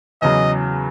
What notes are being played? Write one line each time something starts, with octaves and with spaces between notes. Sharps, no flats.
E2 C#3 F#3 D#5